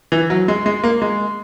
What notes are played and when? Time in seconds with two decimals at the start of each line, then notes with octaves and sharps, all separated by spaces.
0.12 E3
0.30 F#3
0.48 G#3
0.66 G#3
0.84 A#3
1.02 G#3